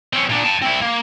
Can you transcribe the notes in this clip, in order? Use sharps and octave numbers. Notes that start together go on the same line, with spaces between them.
C4 C#4
A#2 D4
G5 A5
C4 E4
A#3